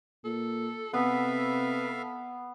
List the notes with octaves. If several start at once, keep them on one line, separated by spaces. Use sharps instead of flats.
A#2 A4
C3 B3 A4 B4 E5 F5